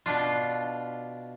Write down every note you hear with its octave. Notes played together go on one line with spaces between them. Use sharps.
B2 D4 F4